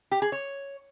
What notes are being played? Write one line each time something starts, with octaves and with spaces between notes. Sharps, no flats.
G4
G#4
C#5